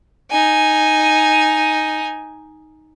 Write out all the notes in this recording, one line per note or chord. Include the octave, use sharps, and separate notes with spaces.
D#4 G#5